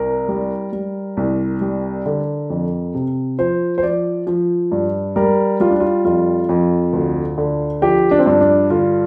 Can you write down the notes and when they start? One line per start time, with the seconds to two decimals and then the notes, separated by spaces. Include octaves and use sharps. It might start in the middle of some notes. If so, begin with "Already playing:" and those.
Already playing: C2 A#4
0.29 G3
0.73 G3
1.17 C2
1.61 G3
2.06 D3
2.50 F2
2.94 C3
3.39 F3 C5
3.78 C5
3.83 F3 D5
4.27 F3
4.72 G2
5.16 G3 A#4
5.60 G3 F4
5.70 D4
5.80 F4
6.05 F2 F4
6.49 F2
6.93 D2
7.38 D3
7.82 F3 G4
8.11 D4
8.19 C4
8.26 G2 D4
8.41 D4
8.70 D3 F4